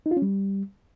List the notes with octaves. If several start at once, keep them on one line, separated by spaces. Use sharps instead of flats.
D#4
F4
C#4
G3